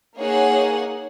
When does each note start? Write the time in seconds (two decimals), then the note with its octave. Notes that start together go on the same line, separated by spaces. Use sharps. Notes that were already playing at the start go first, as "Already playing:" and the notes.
0.19 A#3 D#4 G#4 C#5 F#5